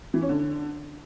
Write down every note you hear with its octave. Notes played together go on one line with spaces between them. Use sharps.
E3
C#4
D3